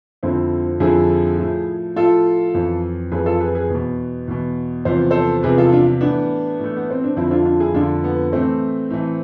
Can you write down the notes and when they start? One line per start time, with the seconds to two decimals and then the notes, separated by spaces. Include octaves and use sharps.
0.23 F2 D3 F3 C4 E4
0.80 F2 D3 F3 E4 G#4
1.38 A2 F3
1.96 A2 F3 F4 A4
2.54 F2 E3
3.12 F2 E3 G#4 B4
3.26 F4 A4
3.41 G#4 B4
3.55 G#4 B4
3.70 E2 B2
4.28 E2 B2
4.85 E2 C3 F3 C5
5.11 A4 C5
5.43 E2 C3 F3 G#4 B4
5.58 F4 A4
5.72 D4 F4
6.01 A2 E3 B3 D4
6.59 A2 E3 A3
6.77 B3
6.90 C4
7.04 D4
7.17 F2 D3 F3 C4 E4
7.31 D4 F4
7.45 D4 F4
7.60 E4 G#4
7.74 F2 D3 F3 D4 F4
8.04 B3
8.32 A2 E3 A3 C4
8.90 A2 E3